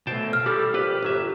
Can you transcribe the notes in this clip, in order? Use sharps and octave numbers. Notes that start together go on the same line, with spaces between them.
B2 A3 C5 G5 A5
F6
G3 G4 A4
A#1 G4 B4
G1 F#3 E5